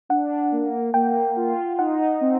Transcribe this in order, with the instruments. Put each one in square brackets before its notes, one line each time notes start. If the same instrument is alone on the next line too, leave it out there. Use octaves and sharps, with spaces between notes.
[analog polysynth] D4 [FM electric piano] F#5
[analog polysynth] A#3
[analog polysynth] A#3 [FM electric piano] G5
[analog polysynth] F4
[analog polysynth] D#4 [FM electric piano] F#5
[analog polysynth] C4